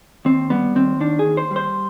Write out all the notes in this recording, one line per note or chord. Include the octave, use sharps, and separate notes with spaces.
D#2 C4
G3 B3
D#2 C4
D#3 D4
G#4
D#2
C5
G3
C5